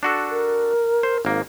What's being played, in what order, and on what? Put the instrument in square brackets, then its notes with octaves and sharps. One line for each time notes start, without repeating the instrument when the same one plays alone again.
[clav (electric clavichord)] D4 F#4 A4
[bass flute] A#4
[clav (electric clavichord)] C5
G#1 A#3